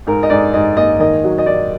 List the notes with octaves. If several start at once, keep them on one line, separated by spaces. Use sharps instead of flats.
G#2 A#4
D#5
G#2 D5
G#2 D#5
A#3 D#5
D#3 D#5
F#3
D#5
D#3 D5